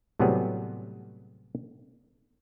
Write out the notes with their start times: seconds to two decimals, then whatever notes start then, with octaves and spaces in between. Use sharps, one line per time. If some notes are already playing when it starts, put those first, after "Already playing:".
0.20 A2 C3 F#3 G3 B3 G#4